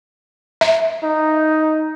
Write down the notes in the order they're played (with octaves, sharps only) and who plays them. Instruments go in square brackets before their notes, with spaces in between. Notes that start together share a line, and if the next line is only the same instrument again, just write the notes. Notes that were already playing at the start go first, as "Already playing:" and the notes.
[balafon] E5
[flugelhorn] D#4